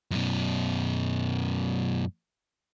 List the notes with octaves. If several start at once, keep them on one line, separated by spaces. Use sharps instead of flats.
F#2 B2